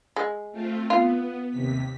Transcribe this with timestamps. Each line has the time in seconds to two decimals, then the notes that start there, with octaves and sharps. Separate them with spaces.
0.16 G#3
0.52 A3 C4 F4
0.90 B3 F4
1.51 D#2 C3 B6